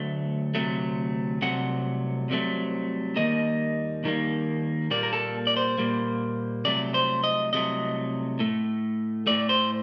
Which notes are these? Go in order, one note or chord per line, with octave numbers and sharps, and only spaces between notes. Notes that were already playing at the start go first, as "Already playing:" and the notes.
Already playing: D2 F#3 A3
D2 C3 F#3 A3
C2 C3 F#3 A3 F#5
C2 C3 F#3 A3
D#2 D#3 G3 A#3 D#5
D#2 D#3 G3 A#3
A#2 G3 A#3 D5
A#4
A4
D5
C5
A#2 G3 A#3
C2 C3 F#3 A3 D5
C5
D#5
C2 C3 F#3 A3 D#5
A2 A3
A2 A3 D5
C5